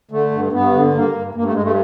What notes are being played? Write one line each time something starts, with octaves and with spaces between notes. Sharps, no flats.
D3 A3
G2
G2 B3
D3
G2 A#3
G2
G2 A#3
A3
G2 G#3
A3